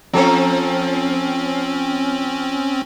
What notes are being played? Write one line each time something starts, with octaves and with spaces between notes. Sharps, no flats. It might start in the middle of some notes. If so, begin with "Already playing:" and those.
F3 C4 C#4 A4 C#5